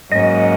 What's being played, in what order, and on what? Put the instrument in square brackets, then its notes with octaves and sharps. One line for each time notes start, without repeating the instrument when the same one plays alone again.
[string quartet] G#2 F#3 A#3 C#4 F#4 [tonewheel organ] D#5